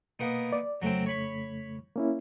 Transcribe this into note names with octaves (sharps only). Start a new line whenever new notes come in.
B2 A#3 B3 D#4
D5
F2 C#3 F#3 A3 C4
C#5 B5 C#6
A#3 C#4 E4